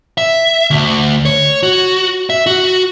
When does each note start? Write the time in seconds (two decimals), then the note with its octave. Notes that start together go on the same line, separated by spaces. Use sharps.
0.18 E5
0.71 D2
1.25 C#5
1.63 F#4
2.30 E5
2.46 F#4